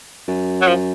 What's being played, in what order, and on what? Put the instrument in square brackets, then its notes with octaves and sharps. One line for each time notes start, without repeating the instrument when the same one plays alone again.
[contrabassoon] F#2
[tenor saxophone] F#3
F3